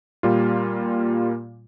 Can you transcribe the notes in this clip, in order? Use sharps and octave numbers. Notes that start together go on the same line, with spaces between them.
A#2 G3 A#3 F4